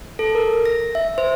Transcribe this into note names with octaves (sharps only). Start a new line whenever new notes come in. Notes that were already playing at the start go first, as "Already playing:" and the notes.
A4
A#4
A#6
E5
C5